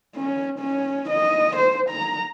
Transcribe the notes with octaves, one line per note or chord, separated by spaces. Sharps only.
C#4
C#4
D#5
C5
A#5